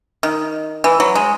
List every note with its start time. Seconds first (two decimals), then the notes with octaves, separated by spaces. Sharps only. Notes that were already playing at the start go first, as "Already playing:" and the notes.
0.23 D#3
0.84 E3
1.00 F#3
1.15 G#3